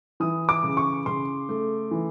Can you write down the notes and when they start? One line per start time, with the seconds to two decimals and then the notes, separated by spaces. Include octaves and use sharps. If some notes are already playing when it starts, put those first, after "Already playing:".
0.20 E3 D#6
0.49 D6
0.63 C#3
0.77 C#6
1.06 C#3 C6
1.49 A3
1.91 E3